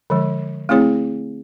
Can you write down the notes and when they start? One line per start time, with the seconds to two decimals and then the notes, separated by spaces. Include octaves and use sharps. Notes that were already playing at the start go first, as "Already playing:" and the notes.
0.10 D3 F3 G#3
0.69 A3 C4 E4 G#4 C#5